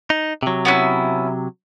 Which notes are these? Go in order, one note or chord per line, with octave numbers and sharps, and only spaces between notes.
D#4
C3 F#3
B3 C#4 E4